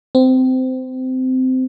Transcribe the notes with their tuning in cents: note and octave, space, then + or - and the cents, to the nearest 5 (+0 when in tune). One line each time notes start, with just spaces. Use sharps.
C4 -20